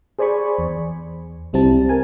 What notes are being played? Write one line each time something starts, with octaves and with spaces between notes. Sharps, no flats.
G#4 C5 D5 G#5 B5 C#6
E2
C2 G3 C4 E4 A5
A#4 G#5